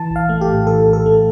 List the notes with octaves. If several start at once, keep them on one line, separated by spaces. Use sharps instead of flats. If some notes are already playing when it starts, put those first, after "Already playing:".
Already playing: E3 A5
A#1
F5
A3
G4
A2
E3 A4
A#1
A4
A3